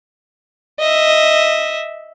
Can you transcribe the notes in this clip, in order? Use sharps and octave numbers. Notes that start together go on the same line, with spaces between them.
D#5 E5